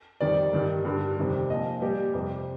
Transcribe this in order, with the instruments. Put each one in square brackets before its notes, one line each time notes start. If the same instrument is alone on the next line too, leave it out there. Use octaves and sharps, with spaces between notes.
[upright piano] F2 D#3 G3 D5
G2 D#3 G3
G2 D3 G3
F2 C3 D#3 G3
A#2 F3 D#5
A#2 G3 G4
F2 C3 G3